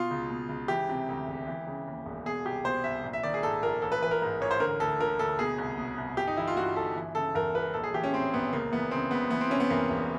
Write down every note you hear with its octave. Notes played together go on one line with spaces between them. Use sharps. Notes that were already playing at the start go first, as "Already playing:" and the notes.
Already playing: B2 F4
C#2
B2
C#2
E3 G4
C3
D2
E1
E3
C#3
D#2
E1
B2 G#4
C2 G4
B2 C5
C2 E5
A#1
E5
D#3 D5
G#4
G#2 A4
A#1 A#4
A1 A4
B4
E3 B4
A#4
G#2
A1 C#5
C5
D3 A#4
D2 A4
D3 A#4
D2 A4
B2 G#4
C2
B2
C2
G1 G4
D#4
E3 E4
F4
G2 F#4
G1 A4
E3
C#3 A4
E2 A#4
E1 B4
A#1 A4
G#4
E3 G4
C#4
A2 C4
A#1 B3
C#2 A#3
E3 B3
C#3 C4
C#2 B3
E3 B3
C4
C3 C#4
B3
E2 A#3
E1